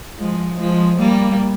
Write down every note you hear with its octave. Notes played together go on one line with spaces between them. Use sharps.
F3 G#3
F3 G#3
G3 A#3